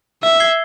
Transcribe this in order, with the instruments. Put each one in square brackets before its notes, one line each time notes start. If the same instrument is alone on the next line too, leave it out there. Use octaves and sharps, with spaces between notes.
[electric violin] E5 [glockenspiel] E6
[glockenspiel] G#6 C7 G7